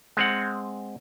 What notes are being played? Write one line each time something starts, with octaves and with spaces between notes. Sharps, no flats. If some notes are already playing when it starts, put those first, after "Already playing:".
G#3 C4 F#5